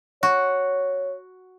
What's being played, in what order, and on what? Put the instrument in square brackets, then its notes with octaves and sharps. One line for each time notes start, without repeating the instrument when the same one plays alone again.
[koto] F#4 [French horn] C#5